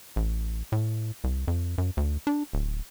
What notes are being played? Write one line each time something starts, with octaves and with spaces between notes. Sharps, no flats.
A1
A2
C2
F2
F#2
D2
D4
D1